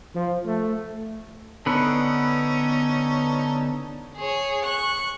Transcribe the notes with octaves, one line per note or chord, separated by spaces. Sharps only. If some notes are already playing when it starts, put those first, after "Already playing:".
F3
A3
D3 B3 C#4 D#4 A4 B4
G#4 C#5
C#6 F#6